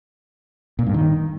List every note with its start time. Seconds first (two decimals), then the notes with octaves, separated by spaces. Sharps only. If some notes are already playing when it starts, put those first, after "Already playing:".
0.79 A#2
0.86 G2
0.94 D#3